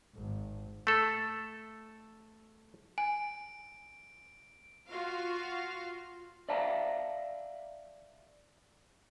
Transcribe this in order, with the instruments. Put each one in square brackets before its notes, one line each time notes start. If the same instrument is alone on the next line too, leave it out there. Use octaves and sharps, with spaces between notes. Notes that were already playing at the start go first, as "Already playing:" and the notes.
[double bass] G#1
[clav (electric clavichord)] A3 A4
[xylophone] G#5 [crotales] D7
[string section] F4 F#4 F5
[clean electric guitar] D5 E5 F5 A5 A#5